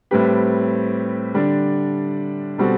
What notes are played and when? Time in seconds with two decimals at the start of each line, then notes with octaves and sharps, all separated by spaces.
0.11 A2 G3 C4 G4 B4
1.34 D3 G3 D4
2.58 B2 G3 C4 F#4 A4